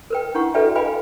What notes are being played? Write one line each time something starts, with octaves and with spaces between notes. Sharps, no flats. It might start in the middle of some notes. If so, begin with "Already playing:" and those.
A#4 B4 G5
D4 E4 F#5 C#6
F#4 A4 B4 D5 E5 G5
B4 D#5 F5 G5 G#5 B5